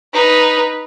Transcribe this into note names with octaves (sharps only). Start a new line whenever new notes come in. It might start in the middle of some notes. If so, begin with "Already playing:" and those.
D#4 B4